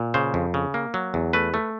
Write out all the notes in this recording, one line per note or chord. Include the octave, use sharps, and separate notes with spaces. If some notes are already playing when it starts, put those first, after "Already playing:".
Already playing: A#2
C#3 C5
F2
C#3
A#3
F#3
E2
A3 B4
A3